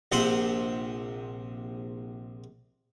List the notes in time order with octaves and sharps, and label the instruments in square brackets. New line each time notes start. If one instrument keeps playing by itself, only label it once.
[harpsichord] A#1 C3 C5 F#5